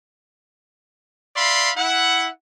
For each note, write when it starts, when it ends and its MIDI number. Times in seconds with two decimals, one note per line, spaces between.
1.36 1.71 74
1.36 1.71 76
1.36 1.71 77
1.36 1.71 83
1.36 1.71 84
1.76 2.29 64
1.76 2.29 78